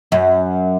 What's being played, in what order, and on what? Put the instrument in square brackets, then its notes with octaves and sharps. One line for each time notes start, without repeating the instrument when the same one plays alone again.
[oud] F#2